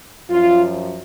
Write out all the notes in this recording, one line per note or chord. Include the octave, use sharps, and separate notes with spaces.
F#2 F3 F4